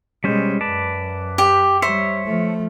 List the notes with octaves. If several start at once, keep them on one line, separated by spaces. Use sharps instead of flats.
B2 G3 G#3 C#4 C5
F#2 B4 D5 A5
G4
G3 C5 C#5 E5
F3 A3